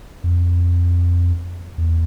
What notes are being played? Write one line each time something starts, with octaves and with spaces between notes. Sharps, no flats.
F2
E2